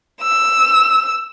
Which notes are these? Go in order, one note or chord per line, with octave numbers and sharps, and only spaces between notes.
E6